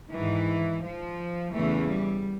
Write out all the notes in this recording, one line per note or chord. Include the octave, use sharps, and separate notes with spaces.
G#2 D#3 E3
F3
E2 C#3 E3 A3
G3